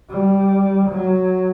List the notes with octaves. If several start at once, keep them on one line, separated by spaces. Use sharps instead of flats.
G3
F#3